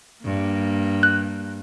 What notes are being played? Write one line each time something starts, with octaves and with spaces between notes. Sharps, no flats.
G2 A#3
F#6